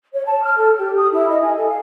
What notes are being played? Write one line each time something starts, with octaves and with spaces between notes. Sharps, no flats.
C#5
A5
F6
A4
G4
D#6
E4
D#5
G#5
A4
F5